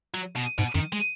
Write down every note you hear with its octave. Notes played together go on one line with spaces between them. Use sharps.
F#3
B2
G#2 B2
F#2 D#3
G#3